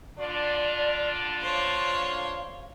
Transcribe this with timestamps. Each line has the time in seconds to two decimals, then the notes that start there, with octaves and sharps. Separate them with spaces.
0.19 D3 D4 F4 D5
1.42 C5 C#5 F5